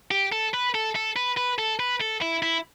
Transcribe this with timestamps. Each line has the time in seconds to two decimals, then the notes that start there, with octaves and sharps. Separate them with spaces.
0.11 G4
0.32 A4
0.53 B4
0.74 A4
0.95 A4
1.16 B4
1.37 B4
1.58 A4
1.79 B4
2.01 A4
2.22 E4
2.42 E4